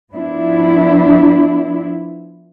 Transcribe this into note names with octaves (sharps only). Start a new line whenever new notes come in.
F3 B3 D4 E4